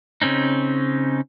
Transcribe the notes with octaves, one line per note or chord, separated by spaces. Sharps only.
C#3 C4 C#4 D#4